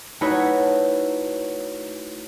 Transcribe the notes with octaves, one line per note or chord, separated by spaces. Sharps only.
A3 D#4 E4 F#4 B4 C#5